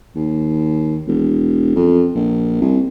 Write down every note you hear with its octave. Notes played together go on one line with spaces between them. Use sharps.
D#2
E1
F2
A#1
C2